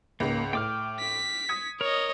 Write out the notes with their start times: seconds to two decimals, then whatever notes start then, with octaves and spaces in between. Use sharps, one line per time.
0.20 C#2 G#2 C#3 A#3
0.53 A2 G5 D6 F6
1.00 B6
1.48 D#6 G#6 C#7
1.81 A#4 C#5 D#5